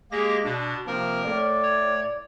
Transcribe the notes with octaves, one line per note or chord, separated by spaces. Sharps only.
G#3 A#3 G4 A#6
B2 D4
C3 F3 A#3 A#4
A2 D5
C#5